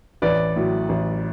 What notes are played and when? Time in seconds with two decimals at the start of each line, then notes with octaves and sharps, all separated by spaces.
0.22 A1 B4 D5
0.56 A2 F#3
0.89 A1